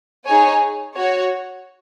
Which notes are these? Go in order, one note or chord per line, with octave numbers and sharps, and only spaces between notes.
D#4 G#4 C#5 G#5
F#4 C#5